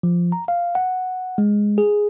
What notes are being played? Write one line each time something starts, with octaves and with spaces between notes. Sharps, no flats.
F3
A#5
F5
F#5
G#3
G#4